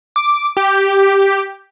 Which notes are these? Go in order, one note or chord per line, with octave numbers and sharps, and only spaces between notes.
D6
G4